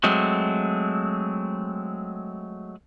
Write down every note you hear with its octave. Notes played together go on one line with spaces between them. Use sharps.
F#3 G#3 A3 C4